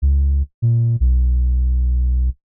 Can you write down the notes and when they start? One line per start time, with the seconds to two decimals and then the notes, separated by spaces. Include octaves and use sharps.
0.02 C#2
0.62 A#2
1.00 B1